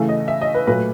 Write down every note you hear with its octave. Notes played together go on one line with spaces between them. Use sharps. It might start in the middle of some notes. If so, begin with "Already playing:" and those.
Already playing: C#3 E3 A3
D#5
E5
D#5
B4
A#2 F#3 A3 B4